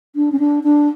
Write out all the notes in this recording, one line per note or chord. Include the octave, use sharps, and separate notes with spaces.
D4
C#4
D4
D4